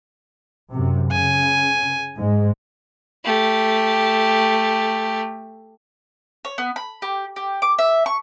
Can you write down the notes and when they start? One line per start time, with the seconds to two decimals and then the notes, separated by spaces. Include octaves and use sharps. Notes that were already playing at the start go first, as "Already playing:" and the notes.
0.72 F#2 C3
1.12 C#3 G#5
2.17 G#2 G#3
3.24 A3 G4
6.45 C#5
6.58 B3
6.76 B5
7.02 G4
7.36 G4
7.62 D6
7.79 E5
8.06 C#6